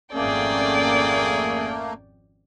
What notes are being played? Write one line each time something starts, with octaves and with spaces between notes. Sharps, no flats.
G#1 F2 A3 A#3 C#4 G#4 D5 G5